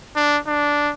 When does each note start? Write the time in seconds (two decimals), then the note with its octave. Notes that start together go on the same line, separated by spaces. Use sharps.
0.16 D4
0.47 D4